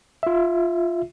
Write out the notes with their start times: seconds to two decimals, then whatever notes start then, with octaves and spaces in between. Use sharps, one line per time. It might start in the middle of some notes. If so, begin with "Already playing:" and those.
0.23 F4 E5